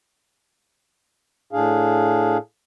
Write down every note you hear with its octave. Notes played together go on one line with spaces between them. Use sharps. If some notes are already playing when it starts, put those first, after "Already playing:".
A2 D4 G#4 F5